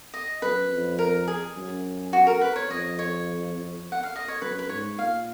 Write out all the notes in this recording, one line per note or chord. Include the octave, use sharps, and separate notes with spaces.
D#5
F#2 B4
F2
A#4
G#4
F#2
F#4
A#4
B4
C#5
F2 D#5
C#5
F#5
F5
D#5
C#5
F#2 B4
B4
G#2 C#5
A#2 F5